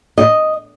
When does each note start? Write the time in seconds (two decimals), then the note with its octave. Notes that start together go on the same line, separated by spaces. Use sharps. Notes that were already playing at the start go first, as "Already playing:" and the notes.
0.18 D#5